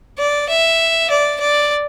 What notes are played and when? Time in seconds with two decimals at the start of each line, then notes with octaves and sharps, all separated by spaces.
0.19 D5
0.49 E5
1.10 D5
1.40 D5